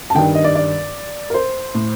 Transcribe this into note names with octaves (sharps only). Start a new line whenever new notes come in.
A5
G2 D#3 G5
D#5
D5
D5
A#4
C5
A2